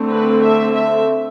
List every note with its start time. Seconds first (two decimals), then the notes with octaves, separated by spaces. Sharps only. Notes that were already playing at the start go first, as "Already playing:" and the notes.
Already playing: D3 A3 C4
0.10 B4
0.42 E5
0.73 E5